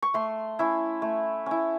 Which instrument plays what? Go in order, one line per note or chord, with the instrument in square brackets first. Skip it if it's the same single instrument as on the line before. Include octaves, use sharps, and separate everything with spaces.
[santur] C#6
A3 C6
C#4 E4
A3
C#4 E4